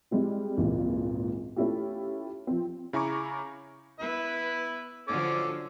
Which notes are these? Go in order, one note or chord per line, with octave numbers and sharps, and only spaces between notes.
G3 G#3 C4 E4
G#1 C#2 A#2 E3
A3 C#4 E4 F4 G4
F3 C4
C#3 E4 G#5 A#5 C#6 D6
B3 E4 B4 E5
D3 F3 F#3 C#4 A4 D6